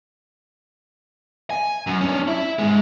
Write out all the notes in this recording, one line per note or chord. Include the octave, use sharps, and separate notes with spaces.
G#5
F#2
C#4 D4
E4 E5
G#2 G#3